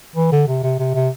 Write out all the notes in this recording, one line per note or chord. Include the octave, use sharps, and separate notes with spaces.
E3
D3
C3
C3
C3
C3